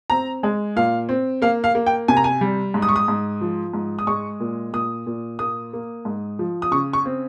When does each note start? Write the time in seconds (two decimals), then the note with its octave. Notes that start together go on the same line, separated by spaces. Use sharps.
0.10 C4 A#5
0.43 G#3
0.76 A#2 F5
1.09 C4
1.42 A#3 F5
1.64 F5
1.75 A#3
1.86 G5
2.08 C3 G#5
2.17 A#5
2.24 G#5
2.41 G3
2.74 G#2
2.82 D#6
2.89 C#6
2.96 D#6
3.08 G#2
3.41 F3
3.74 G#2
3.99 D#6
4.07 G#3 C#6
4.40 A#2
4.73 A#2 D#6
5.06 A#2
5.39 A#3 D#6
5.73 A#3
6.05 G#2
6.39 F3
6.62 D#6
6.71 C#3 C#6
6.93 C#6
7.05 C4